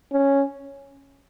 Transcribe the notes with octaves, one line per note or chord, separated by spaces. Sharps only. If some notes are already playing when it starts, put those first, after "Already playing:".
C#4